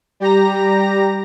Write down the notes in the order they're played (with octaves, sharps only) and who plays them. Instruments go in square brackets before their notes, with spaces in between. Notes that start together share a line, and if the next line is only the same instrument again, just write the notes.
[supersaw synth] G3 G4 A#5 A#6